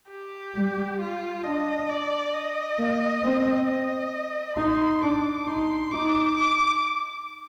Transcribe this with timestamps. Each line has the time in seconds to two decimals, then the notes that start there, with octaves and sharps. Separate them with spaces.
0.10 G4
0.54 G3
1.00 F4
1.44 D4 D#5
1.89 D5
2.34 D#5
2.78 A#3
3.24 C4
3.68 D#5
4.57 D#4 C6
5.02 D4 D6
5.47 D#4 C6
5.91 D#4 D6
6.37 D6